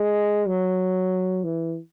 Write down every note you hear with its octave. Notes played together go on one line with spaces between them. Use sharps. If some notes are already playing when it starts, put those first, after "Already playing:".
Already playing: G#3
F#3
E3